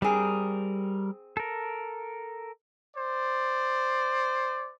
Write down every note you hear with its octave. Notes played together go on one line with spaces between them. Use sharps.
G3 C4 G#4 A#4
A4 A#4
C5 D5